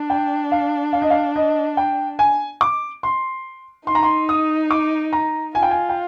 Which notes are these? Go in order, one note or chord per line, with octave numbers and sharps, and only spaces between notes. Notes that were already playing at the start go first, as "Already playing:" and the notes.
Already playing: D4
G5
F5
F5
D#5
F5
D#5
G5
G#5
D6
C6
D#4 C6
A#5
C6
D#6
D6
A#5
F4 G#5
G5
G#5
G5